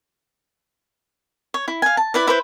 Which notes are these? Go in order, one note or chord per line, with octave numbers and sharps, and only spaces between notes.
C#5
E4
F5 G#5
A5
E4 B4 D5
E4 B4 C5